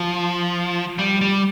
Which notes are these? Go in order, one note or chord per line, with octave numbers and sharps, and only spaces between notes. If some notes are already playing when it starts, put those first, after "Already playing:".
Already playing: F3
G3
G3